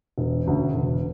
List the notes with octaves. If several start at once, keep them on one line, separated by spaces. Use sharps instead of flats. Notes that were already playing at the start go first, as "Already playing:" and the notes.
E1
D2 C#3
E1